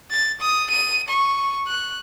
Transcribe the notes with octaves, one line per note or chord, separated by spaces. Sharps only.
A6
D#6
D#7
C#6
F#6